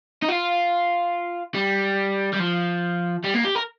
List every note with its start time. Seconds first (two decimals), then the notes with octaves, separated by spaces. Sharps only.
0.22 D#4
0.29 F4
1.55 G3
2.33 G3
2.39 F3
3.24 G3
3.34 A#3
3.44 G4
3.55 A#4